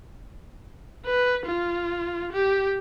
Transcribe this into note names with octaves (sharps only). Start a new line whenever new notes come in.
B4
F4
G4